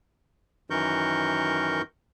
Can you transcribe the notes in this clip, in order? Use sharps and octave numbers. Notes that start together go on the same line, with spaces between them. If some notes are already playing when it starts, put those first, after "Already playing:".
F#2 D#3 E3 A#4 C#6 G6